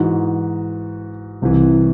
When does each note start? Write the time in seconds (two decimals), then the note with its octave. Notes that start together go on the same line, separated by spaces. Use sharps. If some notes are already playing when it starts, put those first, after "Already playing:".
Already playing: G#2 E3 D#4 F#4
1.42 C2 C3 E3